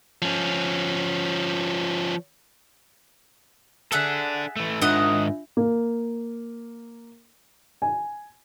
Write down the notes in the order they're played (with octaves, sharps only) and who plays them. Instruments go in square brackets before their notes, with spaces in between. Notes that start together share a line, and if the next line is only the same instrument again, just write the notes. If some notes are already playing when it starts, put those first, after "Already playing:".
[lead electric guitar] F3 C#4
[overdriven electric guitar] D4 A4 [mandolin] G#4 E5 F#5 [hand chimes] A6 B6
[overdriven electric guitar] E3 A3
[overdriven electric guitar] G#2 D#3 [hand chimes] D4 F4 E5 [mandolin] D#5 F#5
[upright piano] A#3
G#5